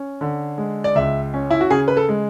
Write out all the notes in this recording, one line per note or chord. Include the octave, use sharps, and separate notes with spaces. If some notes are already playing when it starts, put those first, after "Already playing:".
Already playing: C#4
D3
G#3
D5
C#2 E5
C#4
E4
F#4
C#3 G#4
B4
A4
G#3